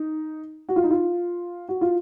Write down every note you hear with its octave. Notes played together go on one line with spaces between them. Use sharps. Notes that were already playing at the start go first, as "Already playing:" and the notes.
Already playing: D#4
F#4
F4
D#4
F4
F#4
F4